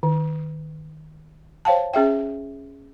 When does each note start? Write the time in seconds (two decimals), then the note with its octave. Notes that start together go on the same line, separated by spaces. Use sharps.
0.03 D#3
1.65 C5 C#5 F5 G5 A5
1.94 C#4 G#4 E5 G5